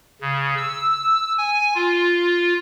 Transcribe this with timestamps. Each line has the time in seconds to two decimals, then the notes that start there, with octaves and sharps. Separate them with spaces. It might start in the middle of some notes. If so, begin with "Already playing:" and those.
0.21 C#3
0.58 E6
1.38 G#5
1.75 F4